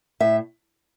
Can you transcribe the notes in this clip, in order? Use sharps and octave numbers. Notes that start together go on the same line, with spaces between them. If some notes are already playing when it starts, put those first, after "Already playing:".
A2 E5